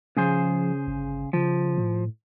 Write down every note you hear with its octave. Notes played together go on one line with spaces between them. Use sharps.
C#3 F3 G#4 C5
G1
C#3 F3
A2